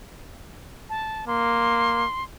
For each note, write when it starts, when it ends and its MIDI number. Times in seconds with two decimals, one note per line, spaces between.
0.90 1.25 81
1.27 2.05 58
1.27 2.24 84